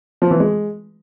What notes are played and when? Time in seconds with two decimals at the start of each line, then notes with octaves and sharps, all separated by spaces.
0.22 F3
0.31 E3
0.40 G#3